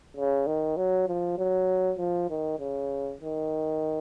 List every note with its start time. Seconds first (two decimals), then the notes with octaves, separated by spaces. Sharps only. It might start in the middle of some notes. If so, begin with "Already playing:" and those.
0.17 C#3
0.47 D#3
0.77 F#3
1.08 F3
1.38 F#3
1.98 F3
2.30 D#3
2.59 C#3
3.21 D#3